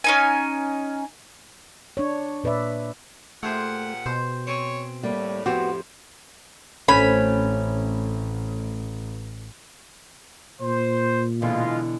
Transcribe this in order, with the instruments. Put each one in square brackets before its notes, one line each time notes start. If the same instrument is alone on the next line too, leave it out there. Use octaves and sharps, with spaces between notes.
[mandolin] C#4 D#4 G#5
[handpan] D4 C#5
A#2 B4 D5 E5
[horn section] A#2 F#5 [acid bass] A3 [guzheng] G4 G#4 C5
[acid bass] B2 [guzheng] C5
[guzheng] C4 G#5 [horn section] C#5
[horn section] A2 [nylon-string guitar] G3 A#3
[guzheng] F2 C5 [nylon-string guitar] B3 F#4 [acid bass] G4
[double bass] A1 [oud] A3 C4 F#4 [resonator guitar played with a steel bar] C#4 [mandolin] B5
[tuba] A#2 [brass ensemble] C5
[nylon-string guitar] B2 D3 E3 [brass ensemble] G#3 F4